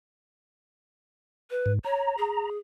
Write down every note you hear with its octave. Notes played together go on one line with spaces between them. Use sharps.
B4
G#2
C#5 A#5
G#4